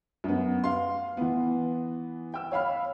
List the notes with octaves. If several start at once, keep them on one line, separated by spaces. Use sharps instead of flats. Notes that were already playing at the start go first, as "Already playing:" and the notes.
F#2 B3
F5 C6
E3 B3
G5 E6
C#5 F5 B5 F6